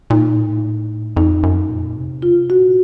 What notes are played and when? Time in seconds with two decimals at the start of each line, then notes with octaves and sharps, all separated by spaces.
0.10 A#2 D#4
0.37 A2
1.16 F2 D#4
1.43 F#2
1.69 A#2
1.97 C3
2.22 C#3 F4
2.41 C3
2.50 F#4
2.59 A#2